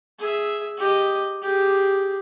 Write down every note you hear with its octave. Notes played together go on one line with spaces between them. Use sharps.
G#4 E5
G4 D#5
G4 G#4